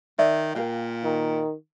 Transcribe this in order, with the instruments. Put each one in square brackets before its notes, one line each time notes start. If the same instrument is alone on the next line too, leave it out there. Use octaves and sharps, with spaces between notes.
[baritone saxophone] D#3 [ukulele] D5 E5
[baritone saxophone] A#2 [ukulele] A#4 F5 G5
[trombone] D#3